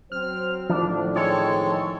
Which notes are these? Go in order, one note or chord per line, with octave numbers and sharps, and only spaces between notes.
F#3 C4 C5 F6
A2 D3 D#3 F3 D4
G#3 C4 A4 C#5